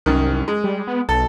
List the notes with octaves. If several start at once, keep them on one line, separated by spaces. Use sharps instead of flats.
C2 F#2 D#3
G#3
G3
B3
B1 A4